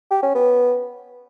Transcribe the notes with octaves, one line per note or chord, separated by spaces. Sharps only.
G4
C#4
B3